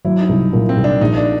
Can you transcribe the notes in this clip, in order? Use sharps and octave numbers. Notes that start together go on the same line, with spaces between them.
F#3 E4
D#4
C2
A#2
C4
C2
D4
A#1 D#4
D4